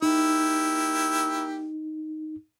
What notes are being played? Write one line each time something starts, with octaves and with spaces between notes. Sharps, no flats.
A#3 D#4 E4 G4